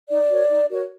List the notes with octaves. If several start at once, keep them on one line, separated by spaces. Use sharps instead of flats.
D#4 D5
F#4 A#4 C#5
D#4
F#4 A#4 C#5